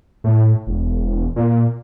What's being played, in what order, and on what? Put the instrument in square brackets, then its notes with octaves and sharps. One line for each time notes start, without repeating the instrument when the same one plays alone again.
[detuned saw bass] A2
E1
A#2